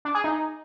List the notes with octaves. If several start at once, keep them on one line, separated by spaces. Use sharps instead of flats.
D4
G#4
D#4